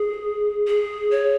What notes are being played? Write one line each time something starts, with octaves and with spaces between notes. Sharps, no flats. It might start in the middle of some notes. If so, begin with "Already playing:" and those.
Already playing: G#4
G#4
C#5